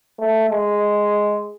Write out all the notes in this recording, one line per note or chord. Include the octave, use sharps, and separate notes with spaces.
A3
G#3